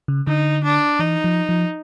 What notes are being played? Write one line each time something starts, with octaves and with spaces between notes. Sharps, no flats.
C#3
D3 D#4
D4
E3 D#4
F3
F3